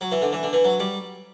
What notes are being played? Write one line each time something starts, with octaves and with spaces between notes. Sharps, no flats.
F#3
E3
D3
E3
D3
E3
F#3
G3